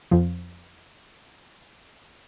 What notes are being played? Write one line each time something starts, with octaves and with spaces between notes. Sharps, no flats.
F2 F3